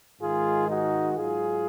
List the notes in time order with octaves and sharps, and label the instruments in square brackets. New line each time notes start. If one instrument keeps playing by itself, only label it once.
[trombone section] G#2 D#3 G#3 F4 G#4
D#4 F#4
G#2 F#3 F4 G#4